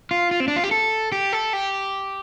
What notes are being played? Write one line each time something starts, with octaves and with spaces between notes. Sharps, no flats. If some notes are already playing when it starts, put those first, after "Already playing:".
F4
F4
C4
D4
F4
G4
A4
G4
A4
G4